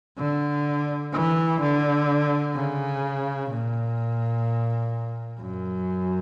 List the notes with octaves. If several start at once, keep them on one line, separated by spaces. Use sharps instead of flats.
D3
E3
D3
C#3
A#2
F#2